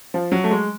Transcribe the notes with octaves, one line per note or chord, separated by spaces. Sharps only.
F3
F#3
A3
G#3